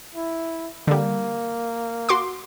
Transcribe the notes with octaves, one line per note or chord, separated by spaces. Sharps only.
E4
D3 G3 A#3
F#4 C6 D6